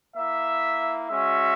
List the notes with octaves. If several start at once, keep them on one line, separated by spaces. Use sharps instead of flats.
A#3 E4 E5
G#3 C#4 F#4 E5